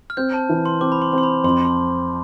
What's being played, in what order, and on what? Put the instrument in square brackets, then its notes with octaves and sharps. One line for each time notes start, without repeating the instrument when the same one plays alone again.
[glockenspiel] F6
[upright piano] C4 [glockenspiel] G6
[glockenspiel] A5
[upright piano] E3
[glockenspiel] C6
[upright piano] C4 [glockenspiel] D6
[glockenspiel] B5
C6
[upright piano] C4
[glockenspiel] C6
B5
[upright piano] F2 [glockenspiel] C6
[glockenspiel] C6